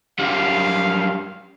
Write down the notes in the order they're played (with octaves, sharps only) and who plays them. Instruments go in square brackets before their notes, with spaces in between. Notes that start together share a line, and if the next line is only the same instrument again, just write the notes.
[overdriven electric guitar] F#2 G3 [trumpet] F5